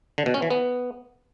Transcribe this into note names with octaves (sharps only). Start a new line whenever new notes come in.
D3
B2
C#4
E3
B3